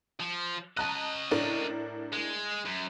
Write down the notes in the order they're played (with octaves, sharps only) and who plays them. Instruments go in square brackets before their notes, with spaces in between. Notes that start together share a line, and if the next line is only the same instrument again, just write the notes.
[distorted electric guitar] F3
[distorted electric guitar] C#4 D#5 [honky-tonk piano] A5 A#5 F#6
[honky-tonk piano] A2 D4 A#4
[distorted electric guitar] G#3
F#2